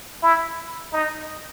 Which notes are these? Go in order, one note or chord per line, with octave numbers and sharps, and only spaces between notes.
E4
D#4